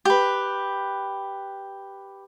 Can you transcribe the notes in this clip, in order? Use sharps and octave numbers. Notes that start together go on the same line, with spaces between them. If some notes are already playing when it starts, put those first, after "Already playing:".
G4 B4